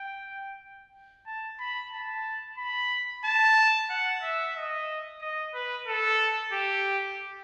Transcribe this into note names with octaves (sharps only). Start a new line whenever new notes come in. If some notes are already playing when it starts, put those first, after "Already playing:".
Already playing: G5
A5
B5
A5
B5
A5
F#5
E5
D#5
D#5
B4
A4
G4